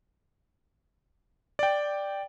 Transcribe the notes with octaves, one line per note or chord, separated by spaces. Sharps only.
D5 G5